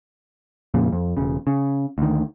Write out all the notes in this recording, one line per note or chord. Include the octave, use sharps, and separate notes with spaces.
F2 A#2 C#3
F2
E1 C#3
C#3
D2 D#3